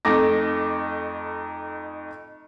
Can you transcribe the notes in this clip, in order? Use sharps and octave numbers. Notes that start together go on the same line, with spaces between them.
F2 A3 D#4 D6 A#6